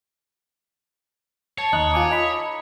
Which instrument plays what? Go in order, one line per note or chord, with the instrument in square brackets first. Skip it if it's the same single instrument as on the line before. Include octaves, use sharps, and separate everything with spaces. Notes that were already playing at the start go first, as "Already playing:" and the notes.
[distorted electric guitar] C#5 [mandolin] A5
[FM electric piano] D#2 F#6 [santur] D#4
[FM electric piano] F4 G#5 D6 [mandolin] A4
[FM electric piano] D#5 B5